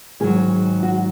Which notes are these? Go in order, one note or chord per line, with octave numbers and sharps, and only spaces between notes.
G#2 D#3 F#3 G#4
F#4